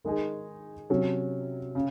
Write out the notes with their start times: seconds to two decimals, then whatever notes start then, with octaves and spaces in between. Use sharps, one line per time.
0.04 D#3 G#3 D#4 G#4
0.90 C3 F#3 C#4
1.75 C#3